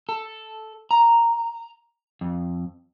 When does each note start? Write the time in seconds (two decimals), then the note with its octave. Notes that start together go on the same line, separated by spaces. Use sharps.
0.09 A4
0.91 A#5
2.21 F2